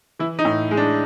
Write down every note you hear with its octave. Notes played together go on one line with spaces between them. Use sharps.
E3 E4
D#4
A2
G#3
D4